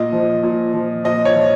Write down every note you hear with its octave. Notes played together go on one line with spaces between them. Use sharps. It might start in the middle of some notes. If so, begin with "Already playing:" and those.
Already playing: A#2 D#5
F3
A#2
F3
A#2 D#5
C#5
F3